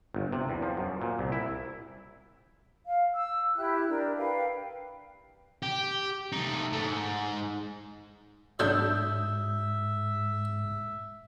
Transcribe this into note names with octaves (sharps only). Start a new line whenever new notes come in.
G1
C3
E2
F3
F#2
A#2
C2
E4
F5
E6
E4 G4 F#6
D4 A#4
B4 F5 G5
G4
A3 D#4
G#2 A3
G#2
G#2 F#3 A3 D4 E5 D#6 E6 G6